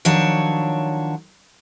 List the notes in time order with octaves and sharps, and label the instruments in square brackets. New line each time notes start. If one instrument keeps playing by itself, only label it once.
[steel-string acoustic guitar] D#3 F3 F#3 D4 C#5 A5